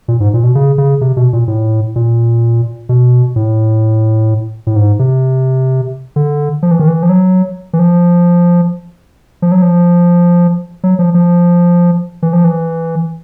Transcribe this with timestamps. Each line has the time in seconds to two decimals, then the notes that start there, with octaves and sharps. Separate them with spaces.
0.08 A#2
0.20 G#2
0.34 A#2
0.44 B2
0.55 C#3
0.78 C#3
1.01 C3
1.17 B2
1.33 A#2
1.48 A2
1.96 A#2
2.89 B2
3.36 A2
4.67 A2
4.76 G#2
4.99 C3
6.16 D3
6.63 F3
6.71 E3
6.79 D#3
6.88 E3
7.03 F3
7.09 F#3
7.73 E3
7.79 F3
9.42 F3
9.52 F#3
9.62 F3
10.84 F#3
10.99 F3
11.14 F3
12.23 E3
12.33 F3
12.44 E3